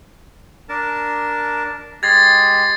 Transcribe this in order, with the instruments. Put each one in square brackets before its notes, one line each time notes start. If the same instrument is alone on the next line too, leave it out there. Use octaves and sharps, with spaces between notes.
[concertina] D4 A#4 A5
[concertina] G#3 G4 D#5 [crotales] G#6 A6 C7